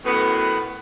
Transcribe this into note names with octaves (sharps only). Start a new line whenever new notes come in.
F#2 A2 B3